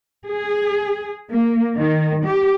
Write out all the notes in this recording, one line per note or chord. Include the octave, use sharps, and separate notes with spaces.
G#4
A#3
D#3
G4